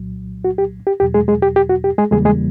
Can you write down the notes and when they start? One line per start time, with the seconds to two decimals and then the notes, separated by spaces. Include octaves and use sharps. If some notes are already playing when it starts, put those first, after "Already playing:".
Already playing: C2 A#2 F#3
0.45 F#4
0.58 G4
0.87 G4
1.00 E2 B2 F#3 G4
1.14 G#3 G#4
1.28 G#3 G#4
1.42 G4
1.56 G4
1.69 F#4
1.84 G4
1.98 G#3 G#4
2.11 E2 C#3 E3 G3 G#3 A#3 G#4
2.25 G#3 G#4